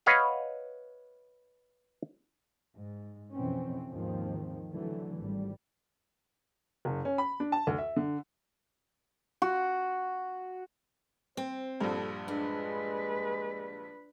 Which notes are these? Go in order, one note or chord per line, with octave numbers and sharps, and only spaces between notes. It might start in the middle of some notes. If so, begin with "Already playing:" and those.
B4 C#5 D#5 F5 F#5
G#2
F2 B2 E3 C4 C#4
D#2 G#2 D#3 F3 C4
D3 E3 F#3 A3
G#1 G3
F#1
C#4
B5
D4
A5
D2
E5
D3
F#4
C4 C5
A#1 G2 A4
G#3 D4 B4